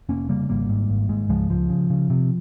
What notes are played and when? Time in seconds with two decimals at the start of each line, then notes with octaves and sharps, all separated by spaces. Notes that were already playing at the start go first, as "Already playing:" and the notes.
0.09 F1 A#3 C#4
0.29 C#3 G3 A#3
0.49 G#1 G3 A#3
0.69 G#2
0.89 G#1
1.09 G#2
1.29 C#2 F3 G#3
1.49 C#2 F3
1.69 C#3
1.90 C#3
2.10 C3